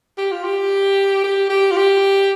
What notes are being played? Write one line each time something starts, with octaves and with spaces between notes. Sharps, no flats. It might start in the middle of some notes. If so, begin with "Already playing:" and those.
G4
F4
G4
G4
G4
F4
G4